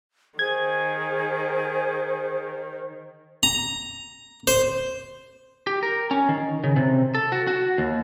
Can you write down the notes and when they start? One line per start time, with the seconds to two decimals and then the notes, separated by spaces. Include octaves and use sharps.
0.39 D#3 G#4 C5 G#6
3.43 A#5
4.47 C5
5.67 G4
5.83 A#4
6.11 C#4
6.29 D#3
6.64 C#3
6.76 C3
7.15 A4
7.32 F#4
7.47 F#4
7.78 D#2